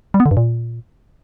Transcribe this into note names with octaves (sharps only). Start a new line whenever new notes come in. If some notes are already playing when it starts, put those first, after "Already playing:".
G3
B3
D3
G2
A#2